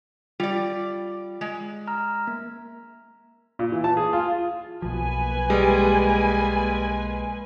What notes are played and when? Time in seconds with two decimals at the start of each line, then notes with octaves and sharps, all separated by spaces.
0.40 G3 F4 D5
1.41 G#3
1.87 A#5 F6
2.27 A#3
3.59 A#2
3.72 E3
3.84 A5
3.97 G#4
4.13 F4
4.82 B1 F3 A#3 B4 G#5
5.50 G3 G#3